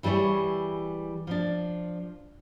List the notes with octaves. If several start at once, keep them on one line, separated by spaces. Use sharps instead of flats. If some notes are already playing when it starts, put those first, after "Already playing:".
E3 G3 E4 G#4 C#5
F3 D4